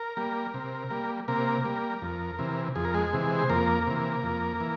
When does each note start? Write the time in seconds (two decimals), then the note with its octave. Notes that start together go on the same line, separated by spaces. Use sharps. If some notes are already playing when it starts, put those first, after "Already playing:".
Already playing: A#4
0.17 G3 A#3
0.54 C3
0.90 G3 A#3
1.28 C3 A#3 A#4
1.65 G3 A#3
2.02 F2
2.39 C3 E3
2.75 F2 G#4
2.85 A#4
2.94 G#3 G#4
3.13 C3 E3
3.39 C5
3.49 F2 A#3 A#4
3.87 C3 E3
4.23 F2
4.60 E3